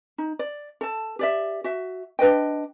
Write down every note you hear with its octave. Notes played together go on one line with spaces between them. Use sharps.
D#4
D5
A4 A5
G4 D5 E5
F#4 E5
D4 B4 D#5 G5